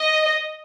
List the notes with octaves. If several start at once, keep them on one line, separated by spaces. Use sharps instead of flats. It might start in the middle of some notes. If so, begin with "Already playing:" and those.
Already playing: D#5